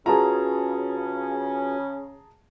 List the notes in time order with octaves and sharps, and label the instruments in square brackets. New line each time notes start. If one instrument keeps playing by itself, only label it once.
[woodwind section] C#3 C#4 [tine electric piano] F4 F#4 B4 [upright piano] G#4 A5 A#5